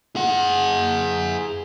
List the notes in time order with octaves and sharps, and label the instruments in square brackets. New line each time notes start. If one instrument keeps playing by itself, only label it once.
[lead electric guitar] G#4 F#5